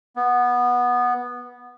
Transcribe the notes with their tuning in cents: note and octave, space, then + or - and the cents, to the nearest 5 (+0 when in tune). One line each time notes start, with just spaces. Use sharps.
B3 -10